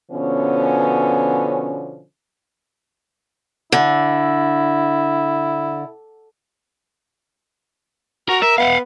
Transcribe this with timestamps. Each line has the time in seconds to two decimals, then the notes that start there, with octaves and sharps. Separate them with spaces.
0.11 B2 D3 F3 B3 C#4
3.72 D3 E4
8.29 F#4 A#4
8.42 A#4 E5
8.58 B3 F5 F#5